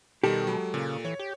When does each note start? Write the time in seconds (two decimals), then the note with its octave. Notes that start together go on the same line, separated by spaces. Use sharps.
0.23 B2 D#3 G3 G4 A4
0.47 F#3 G#3
0.74 A#2 C#3
1.05 E3 C#5
1.19 G4